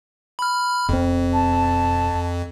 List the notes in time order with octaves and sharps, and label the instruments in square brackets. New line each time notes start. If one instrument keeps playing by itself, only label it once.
[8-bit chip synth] B5 F6
[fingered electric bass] E1 C4 [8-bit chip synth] F2
[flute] A5